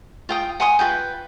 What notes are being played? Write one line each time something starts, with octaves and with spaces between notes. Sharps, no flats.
F4 G5 D#6
F#5 G#5 C6 D#6
F4 F#4 B4 G5